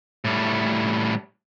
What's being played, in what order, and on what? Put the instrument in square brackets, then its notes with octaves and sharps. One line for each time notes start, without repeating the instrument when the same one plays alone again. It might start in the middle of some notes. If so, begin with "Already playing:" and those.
[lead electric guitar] A2 G3